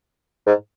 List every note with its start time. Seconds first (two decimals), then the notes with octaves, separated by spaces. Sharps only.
0.47 G#2